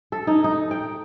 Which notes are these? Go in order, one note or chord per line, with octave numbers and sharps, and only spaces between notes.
A4
D#4
D#4
G5